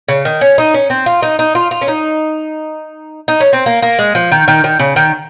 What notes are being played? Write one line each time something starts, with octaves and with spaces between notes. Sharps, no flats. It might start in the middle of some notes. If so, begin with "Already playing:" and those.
C#3
D#3
C#4
D#4
C#4
C4
F4
D#4
D#4
F4
F4
C#4
D#4
D#4
C#4
C4
A#3
A#3
G#3
F3
D#3
D#3
D#3
C#3
D#3